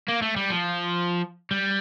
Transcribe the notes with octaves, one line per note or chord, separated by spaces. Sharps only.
A#3
A3
G3
F3
G3